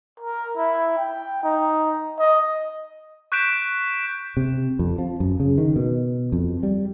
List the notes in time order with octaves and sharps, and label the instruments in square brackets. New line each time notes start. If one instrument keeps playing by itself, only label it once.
[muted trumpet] A#4
E4
G5
D#4
D#5
[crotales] C#6 F#6 G6 B6 D7 E7
[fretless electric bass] C3
F2
F3
F#2
C#3
D#3
B2
F2
G3